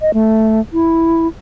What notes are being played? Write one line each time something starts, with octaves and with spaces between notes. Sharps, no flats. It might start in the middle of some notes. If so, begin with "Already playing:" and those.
D#5
A3
E4